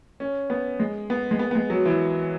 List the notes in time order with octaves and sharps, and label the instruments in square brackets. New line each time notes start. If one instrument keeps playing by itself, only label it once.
[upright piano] C#4
B3
G#3
B3
G#3
B3
B3
G#3
F#3
E3